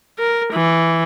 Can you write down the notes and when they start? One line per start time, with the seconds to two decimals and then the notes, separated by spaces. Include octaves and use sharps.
0.19 A#4
0.53 E3